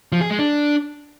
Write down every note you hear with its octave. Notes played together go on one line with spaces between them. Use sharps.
F3
G#4
G#3
D4